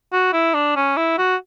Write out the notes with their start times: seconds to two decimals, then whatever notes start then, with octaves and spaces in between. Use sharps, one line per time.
0.12 F#4
0.33 E4
0.54 D4
0.76 C#4
0.97 E4
1.18 F#4